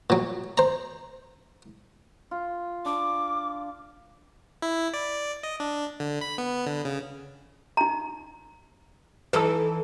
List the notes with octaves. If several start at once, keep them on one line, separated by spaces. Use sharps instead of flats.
A#2 F#3
C5 A#5
F4
D4 D6
E4
D5
D#5
D4
D3
B5
B3
D3
C#3
D#4 A#5
E3 D#4 A4 B4 E6